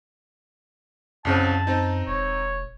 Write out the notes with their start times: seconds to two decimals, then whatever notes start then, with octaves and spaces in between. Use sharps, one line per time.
1.25 C2 F#2 C#3 C4 A5
1.67 C4 D#4
2.07 E1 C#5